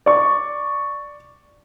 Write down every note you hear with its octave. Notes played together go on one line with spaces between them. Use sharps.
D5 C#6